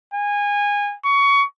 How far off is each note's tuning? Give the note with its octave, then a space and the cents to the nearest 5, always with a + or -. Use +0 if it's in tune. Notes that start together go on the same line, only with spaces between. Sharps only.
G#5 -25
C#6 +20